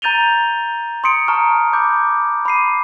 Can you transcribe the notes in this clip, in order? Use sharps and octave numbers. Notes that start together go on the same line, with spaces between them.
A#5 G6 A6 D#7 F7 G7
C6 D#6 C#7 D7
A5 A#5 C#6 F6 C#7
B5 D6 G6
B5 D6 C7 D#7